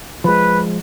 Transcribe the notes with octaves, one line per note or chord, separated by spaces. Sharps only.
F3 G#3 B4